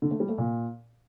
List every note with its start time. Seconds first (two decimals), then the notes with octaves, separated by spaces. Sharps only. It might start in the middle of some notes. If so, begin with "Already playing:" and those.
0.02 D3
0.11 A3
0.20 G3
0.29 A3
0.38 A#2